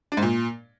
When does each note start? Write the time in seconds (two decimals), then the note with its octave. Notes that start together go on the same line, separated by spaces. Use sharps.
0.12 D4
0.17 G#2
0.23 A#2